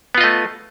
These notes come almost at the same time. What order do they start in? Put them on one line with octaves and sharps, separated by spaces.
B3 F4 D#5 A3